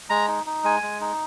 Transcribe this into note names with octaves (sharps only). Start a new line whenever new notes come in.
G#3 A#5
D#4
D#4
G#3 G#5
G#3
D#4